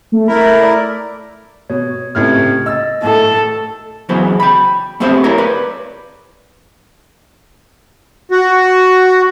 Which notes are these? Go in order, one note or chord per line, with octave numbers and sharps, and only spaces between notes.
A3
A3 E4 A#4 B5
D5
B2 C#5
C#2 A2 C3 F6 G#6
D#5 E6 A6
A2 A4
C#3 E3 F#3 B3 C5
G5 B5
A3 B3 C4 G4 C5 E5
E4 A#4 C#5 A#5
B4 D5
F#4